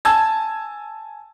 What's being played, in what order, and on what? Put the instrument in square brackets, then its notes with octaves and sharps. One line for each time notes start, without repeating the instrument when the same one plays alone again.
[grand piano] G#5 A5 E6 G#6